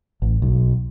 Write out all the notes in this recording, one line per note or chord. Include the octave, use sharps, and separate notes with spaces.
A1
B1